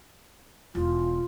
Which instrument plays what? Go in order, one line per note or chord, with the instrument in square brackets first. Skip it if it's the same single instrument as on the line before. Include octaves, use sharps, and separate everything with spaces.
[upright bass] E1 [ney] F4